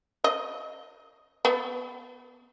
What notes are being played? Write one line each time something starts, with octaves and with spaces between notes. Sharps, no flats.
D#5
B3